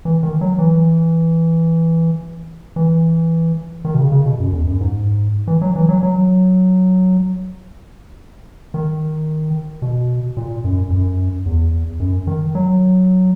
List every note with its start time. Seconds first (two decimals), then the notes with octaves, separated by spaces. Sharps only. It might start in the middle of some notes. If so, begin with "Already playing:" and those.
0.05 E3
0.23 D#3
0.41 F#3
0.59 E3
2.76 E3
3.85 D#3
3.95 B2
3.99 C#3
4.12 C#3
4.26 B2
4.40 F#2
4.53 E2
4.67 F#2
4.81 G#2
5.47 E3
5.62 F#3
5.76 E3
5.89 F#3
6.03 F#3
8.74 D#3
9.82 B2
10.37 A#2
10.64 F#2
10.91 F#2
11.46 E2
12.00 F#2
12.27 D#3
12.55 F#3